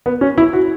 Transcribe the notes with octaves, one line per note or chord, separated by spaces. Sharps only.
B3
C#4
E4
F#4